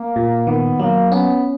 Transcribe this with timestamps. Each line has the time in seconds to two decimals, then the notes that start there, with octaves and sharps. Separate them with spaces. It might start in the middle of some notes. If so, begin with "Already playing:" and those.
Already playing: A#3
0.16 A#2
0.47 D#3 B3
0.80 F#3 A#3
1.11 B3 C#4